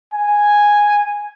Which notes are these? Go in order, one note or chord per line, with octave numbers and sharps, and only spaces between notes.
G#5